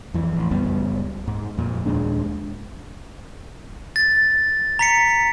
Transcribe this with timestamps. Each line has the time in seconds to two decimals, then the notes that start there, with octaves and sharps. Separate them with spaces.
0.14 F2 E3
0.36 A1
0.51 C#2 F#2 G3 B3
1.28 G#2
1.57 F2 A#2
1.86 D#2 A#2 G#3 D4
3.96 A6
4.79 A#5 B6 C#7